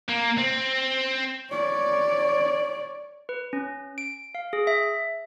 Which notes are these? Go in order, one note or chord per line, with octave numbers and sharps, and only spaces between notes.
A#3
C4
C#5 D5
B4
C#4
D7
F5
G#4
E5